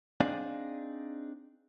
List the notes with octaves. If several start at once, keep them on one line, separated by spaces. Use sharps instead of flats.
C4 D4 D#4 G#4 D5 F5